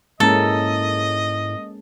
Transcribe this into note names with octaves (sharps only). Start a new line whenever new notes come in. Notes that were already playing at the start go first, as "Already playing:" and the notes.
G#2 G#3 A#3 C#4 E4 A4 D#5 A#5